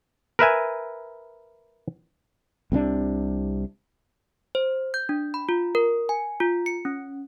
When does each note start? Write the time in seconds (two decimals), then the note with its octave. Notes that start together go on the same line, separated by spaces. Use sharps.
0.39 A#4 B4 E5 G#5
2.72 C2 C3 G#3 D4
4.55 C5
4.94 G6
5.09 D4
5.34 B5
5.49 F4
5.75 A#4
6.09 G#5
6.40 F4
6.66 C#7
6.85 C#4